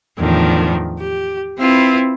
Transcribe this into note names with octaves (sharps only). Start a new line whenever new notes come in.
E2 A2 D#3 F3 D4
G4
C4 E4 F4 B4